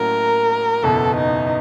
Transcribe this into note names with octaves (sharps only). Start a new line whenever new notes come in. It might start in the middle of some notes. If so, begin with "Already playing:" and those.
Already playing: A2 F#3 A#3 C#4 F#4 A#4
F#1 E2 B2 A4
D#4